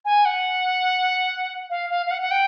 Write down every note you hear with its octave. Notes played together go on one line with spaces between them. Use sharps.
G#5
F#5
F5
F5
F5
F#5
F#5
G5